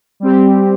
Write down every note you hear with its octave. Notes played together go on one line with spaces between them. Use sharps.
G3 C4 G4